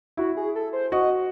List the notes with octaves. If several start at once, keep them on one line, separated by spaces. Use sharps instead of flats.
E4 F#4
G#4
A4
C5
F#4 D#5